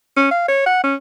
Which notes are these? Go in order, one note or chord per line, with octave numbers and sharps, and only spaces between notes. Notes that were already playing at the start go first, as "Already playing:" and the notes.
C#4
F5
C#5
F#5
C#4